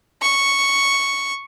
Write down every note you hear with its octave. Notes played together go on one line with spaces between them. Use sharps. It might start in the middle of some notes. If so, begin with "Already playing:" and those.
C#6